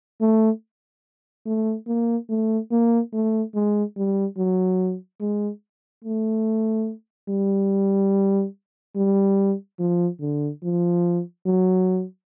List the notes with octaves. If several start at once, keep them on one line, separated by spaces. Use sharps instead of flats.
A3
A3
A#3
A3
A#3
A3
G#3
G3
F#3
G#3
A3
G3
G3
F3
D3
F3
F#3